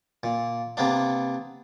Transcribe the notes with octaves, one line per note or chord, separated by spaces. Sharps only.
A#2
C3 A#3 B3 D4